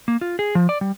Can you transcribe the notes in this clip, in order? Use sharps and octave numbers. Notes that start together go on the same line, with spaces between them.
A#3
F4
G#4
F3
D5
G3